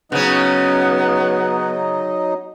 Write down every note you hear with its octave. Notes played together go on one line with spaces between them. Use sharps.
C#3 F#3 B3 C#4 D#4 D#5